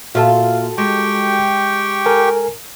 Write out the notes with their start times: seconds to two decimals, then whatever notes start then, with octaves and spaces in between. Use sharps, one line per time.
0.15 A#2 F4 F#4 A4 E5 A5
0.78 G#3 G4 G5 C#6
2.06 A4 A#4 G#5